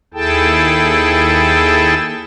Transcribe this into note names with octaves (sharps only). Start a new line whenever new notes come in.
D#2 E4 G#4 A4 G5 A5